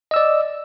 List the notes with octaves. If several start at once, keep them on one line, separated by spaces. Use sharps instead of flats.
D5 D#5 E6